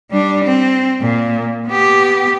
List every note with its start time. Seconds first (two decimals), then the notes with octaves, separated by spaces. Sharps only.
0.11 G3 D4
0.45 C4
1.01 A#2
1.67 B3 G4